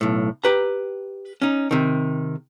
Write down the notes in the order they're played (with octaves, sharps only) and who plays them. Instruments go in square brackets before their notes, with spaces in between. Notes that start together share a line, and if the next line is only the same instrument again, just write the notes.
[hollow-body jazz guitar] B1 A2
G4 B4 A#5
C#4 D#4
C3 D#3